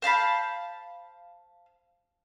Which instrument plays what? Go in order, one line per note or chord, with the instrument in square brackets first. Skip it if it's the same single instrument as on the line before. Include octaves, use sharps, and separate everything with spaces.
[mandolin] C5 F5 A5 B5